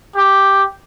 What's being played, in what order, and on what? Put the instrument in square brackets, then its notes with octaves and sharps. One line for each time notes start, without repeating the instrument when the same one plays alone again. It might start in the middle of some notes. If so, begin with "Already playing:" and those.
[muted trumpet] G4